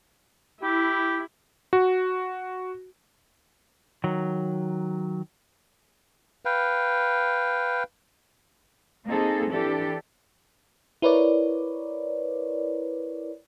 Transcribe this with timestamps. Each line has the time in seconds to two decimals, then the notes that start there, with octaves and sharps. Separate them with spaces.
0.63 E4 G4
1.73 F#4
4.04 D#3 F#3
6.45 B4 F5 G5
9.07 A#3 C4 D#4 G#4 A4
9.51 E3 D4 G4 A4
11.02 E4 A#4 B4 C#5 D5